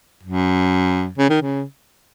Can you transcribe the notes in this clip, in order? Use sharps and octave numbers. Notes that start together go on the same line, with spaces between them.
F#2
C#3
D#3
C#3